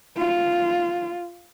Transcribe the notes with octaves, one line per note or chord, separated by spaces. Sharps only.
F4